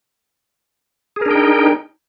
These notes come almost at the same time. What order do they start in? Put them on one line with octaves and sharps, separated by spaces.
G#4 A#4 D4 G5 D#4